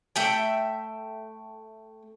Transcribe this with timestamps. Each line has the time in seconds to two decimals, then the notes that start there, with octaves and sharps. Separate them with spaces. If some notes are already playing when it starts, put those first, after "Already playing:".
0.16 A3 E5 G5